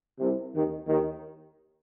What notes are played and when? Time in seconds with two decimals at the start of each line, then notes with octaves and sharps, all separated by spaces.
0.19 C2 C3
0.53 D#2 D#3
0.88 D#2 D#3